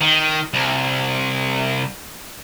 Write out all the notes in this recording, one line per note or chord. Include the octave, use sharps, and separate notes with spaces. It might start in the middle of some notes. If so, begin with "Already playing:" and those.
D#3
C2